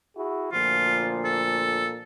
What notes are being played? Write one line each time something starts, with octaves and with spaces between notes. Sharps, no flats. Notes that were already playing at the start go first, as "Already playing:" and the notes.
E4 F#4 G#4
D2 A#2 F3 F4
A4